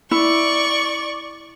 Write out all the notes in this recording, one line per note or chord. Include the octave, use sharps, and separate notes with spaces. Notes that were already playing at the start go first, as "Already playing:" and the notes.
E4 D5 C#6